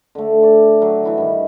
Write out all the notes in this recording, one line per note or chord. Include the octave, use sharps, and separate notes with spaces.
D3 A3
D5
F#3
E3 E4 F#4
G2 D#3